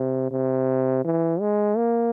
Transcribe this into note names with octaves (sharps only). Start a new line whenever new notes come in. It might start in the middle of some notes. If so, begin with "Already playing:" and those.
Already playing: C3
C3
E3
G#3
A#3